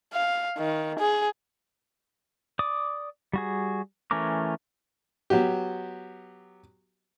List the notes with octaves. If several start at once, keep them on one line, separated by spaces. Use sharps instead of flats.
F5
D#3
G#4
D5 D6 D#6
G3 F#4 G#4
E3 A3 C#4 A#4 D6
F#3 B3 F#4 G4